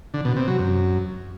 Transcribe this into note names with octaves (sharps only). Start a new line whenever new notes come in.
D3
B2
C3
F#3
F#2